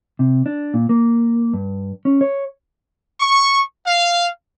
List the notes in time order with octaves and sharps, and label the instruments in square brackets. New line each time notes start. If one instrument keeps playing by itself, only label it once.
[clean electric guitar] C3
D4
A#2
A#3
G2
C#4
C#5
[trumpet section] C#6
F5